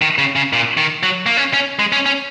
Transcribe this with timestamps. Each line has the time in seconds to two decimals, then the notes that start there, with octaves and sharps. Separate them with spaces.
0.02 D#3
0.18 C#3
0.36 C#3
0.53 A#2
0.77 D#3
1.03 F#3
1.26 A#3
1.37 C#4
1.54 C#4
1.79 G#3
1.92 C#4
2.06 C#4